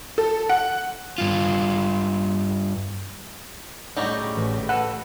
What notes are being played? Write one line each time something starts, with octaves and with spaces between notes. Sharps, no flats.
A4
F#5
G2 F4
A2 C#3 F#3 G3 D#4
A1
A4 B4 F#5